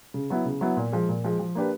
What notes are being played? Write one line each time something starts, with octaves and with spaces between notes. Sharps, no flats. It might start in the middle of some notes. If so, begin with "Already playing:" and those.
C#3
F#3 B3 E4
C#3
F#3 B3 E4
A#2
F3 G#3
A#2
F3 G#3
F3
A#3 D4 G4 B4